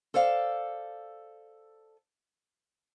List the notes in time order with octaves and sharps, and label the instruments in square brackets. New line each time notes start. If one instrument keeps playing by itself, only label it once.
[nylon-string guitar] A4 C5 D5 F5